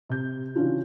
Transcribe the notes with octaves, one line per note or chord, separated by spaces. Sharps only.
C3 G6
C#3 E3 C#4 D4 F4 F#4